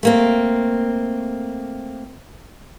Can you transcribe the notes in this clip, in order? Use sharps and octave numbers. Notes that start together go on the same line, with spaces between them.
A3 A#3 C4